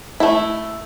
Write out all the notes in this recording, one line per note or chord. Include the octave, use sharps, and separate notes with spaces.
A3 E4